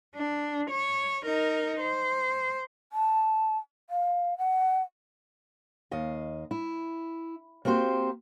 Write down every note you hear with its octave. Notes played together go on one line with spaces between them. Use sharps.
D4
C#5
D#4 A#4
C5
A5
F5
F#5
D#2 D#5 F5
E4
A#3 C4 F#4 G4 C5